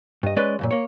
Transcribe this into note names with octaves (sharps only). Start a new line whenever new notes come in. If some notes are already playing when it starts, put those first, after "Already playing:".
G2 D#5
G#3 C#4 B4 D5 D#5
C#2 F#2 A#2
A#3 C#5